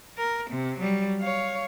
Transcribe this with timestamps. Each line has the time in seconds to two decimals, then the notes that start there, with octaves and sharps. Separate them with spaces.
0.18 A#4
0.50 C3
0.79 F#3 G3
1.20 C#5 F5